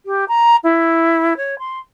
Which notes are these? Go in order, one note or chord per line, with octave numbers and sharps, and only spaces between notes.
G4
A#5
E4
C#5
C6